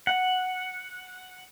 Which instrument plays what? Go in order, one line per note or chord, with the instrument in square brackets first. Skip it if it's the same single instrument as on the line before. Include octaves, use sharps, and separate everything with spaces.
[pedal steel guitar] F#5